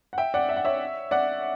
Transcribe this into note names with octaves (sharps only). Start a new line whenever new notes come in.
F#5
E5 G5
D5 F#5
E5
F#5
C#5 E5
D5 F#5